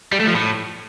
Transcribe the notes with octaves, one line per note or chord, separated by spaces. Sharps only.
G3
A3
F3
A2